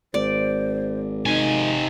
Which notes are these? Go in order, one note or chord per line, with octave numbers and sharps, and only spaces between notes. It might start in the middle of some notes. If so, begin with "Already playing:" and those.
G#1 C5 D5
C3 D#4 G#5